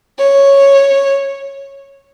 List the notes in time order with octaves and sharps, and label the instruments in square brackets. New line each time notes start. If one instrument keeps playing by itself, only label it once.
[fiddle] C#5